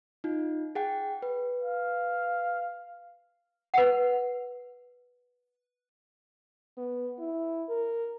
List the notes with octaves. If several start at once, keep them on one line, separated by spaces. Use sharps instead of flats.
D#4 F4
G#4 F#5 G5
B4
F5
B4 F#5
B3
E4
A#4